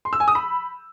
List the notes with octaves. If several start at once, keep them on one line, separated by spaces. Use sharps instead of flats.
C6
E6
G#5
D#6
B5